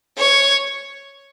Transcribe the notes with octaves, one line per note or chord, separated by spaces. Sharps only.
C#5